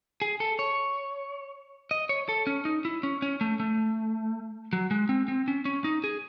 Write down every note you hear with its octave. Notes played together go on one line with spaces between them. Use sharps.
G#4
A4
C#5
D#5
C#5
A4
C#4
D#4
E4
C#4
C#4
A3
A3
F#3
G#3
C4
C4
C#4
C#4
D#4
G#4